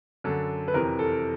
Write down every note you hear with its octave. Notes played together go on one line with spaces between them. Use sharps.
F#2 D3 A4
B4
F2 C3 E3 A#4
A4